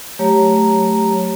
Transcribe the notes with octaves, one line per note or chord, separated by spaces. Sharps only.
F#3 A3 G4 C#5 A#5